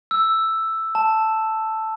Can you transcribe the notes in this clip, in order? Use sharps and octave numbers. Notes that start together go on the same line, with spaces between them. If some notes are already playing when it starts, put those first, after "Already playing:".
E6
A5